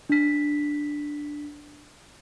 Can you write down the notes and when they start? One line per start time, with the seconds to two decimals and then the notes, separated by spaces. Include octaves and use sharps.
0.10 D4 B6